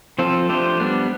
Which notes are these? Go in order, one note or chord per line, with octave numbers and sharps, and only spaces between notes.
F3 C4 F4 A4
F3 A3 D4 G4 C5
G3 B3 D4